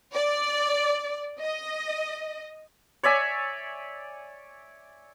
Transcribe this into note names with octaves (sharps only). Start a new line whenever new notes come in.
D5
D#5
C#5 D5 E5 G#5